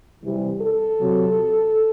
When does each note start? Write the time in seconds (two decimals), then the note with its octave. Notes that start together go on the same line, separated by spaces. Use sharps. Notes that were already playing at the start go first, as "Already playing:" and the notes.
0.24 C3 E3 G3
0.62 A4
1.00 C3 F#3